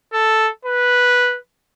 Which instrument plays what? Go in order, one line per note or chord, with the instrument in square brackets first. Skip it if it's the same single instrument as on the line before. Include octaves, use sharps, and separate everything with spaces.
[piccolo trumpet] A4
B4